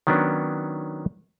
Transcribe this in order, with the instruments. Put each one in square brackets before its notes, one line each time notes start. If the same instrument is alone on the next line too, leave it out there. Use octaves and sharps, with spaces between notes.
[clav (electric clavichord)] D#3 F#3 B3 C#4 D4